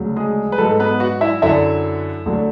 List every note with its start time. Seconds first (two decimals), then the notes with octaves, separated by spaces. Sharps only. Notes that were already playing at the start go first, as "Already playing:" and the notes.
Already playing: D2 C#3 F#3
0.16 G#3 G#4
0.52 B4
0.58 G#2 F#3 A3 A4
0.80 B3 B4
1.00 F#4 F#5
1.21 E4 E5
1.42 F#2 D3 F#3 E4 E5
2.26 D2 D3 F#3